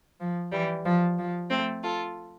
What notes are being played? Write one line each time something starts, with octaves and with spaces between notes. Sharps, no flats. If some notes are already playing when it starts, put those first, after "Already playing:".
F3
E3 G3
F3
F3
A3 C4
F4 A4